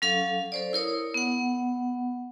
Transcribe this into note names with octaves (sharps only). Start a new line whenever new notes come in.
F#3 C#4 A4 F5
A4 C5 D5
E4 A#4 C#5 D#6
B3 F#5